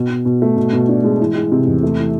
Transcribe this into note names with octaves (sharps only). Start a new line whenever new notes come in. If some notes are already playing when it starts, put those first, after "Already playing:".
Already playing: B2
B2
B2
A3
B2
B2
D4
G#3
E3
G#3
C3
E2
A3
E3